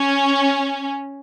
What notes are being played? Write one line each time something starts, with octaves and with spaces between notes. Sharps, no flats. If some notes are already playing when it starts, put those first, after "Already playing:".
Already playing: C#4